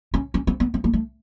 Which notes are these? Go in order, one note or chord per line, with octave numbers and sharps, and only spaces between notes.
C#4
C#4
C4
B3
C4
A#3
A3